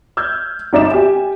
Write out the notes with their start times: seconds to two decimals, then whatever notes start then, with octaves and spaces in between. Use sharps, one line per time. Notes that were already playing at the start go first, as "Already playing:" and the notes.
0.17 E6 F6 G6 G#6
0.73 G1 D#4 D5 E5 E7
0.91 G4 G#5